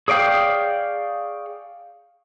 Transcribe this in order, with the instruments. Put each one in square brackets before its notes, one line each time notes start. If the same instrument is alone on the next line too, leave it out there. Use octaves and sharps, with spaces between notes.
[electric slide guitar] G#4 C#5 D5 F5 G5